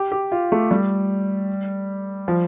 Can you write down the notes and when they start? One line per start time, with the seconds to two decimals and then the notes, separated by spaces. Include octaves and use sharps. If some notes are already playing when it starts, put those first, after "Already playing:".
Already playing: G4
0.12 G4
0.32 F4
0.52 A3
0.71 G3
2.28 F3